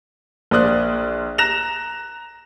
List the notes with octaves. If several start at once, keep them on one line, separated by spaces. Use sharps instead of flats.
A#1 A#3 C5 D5 D#6 F#6
A#5 F#6 A#6 E7 F7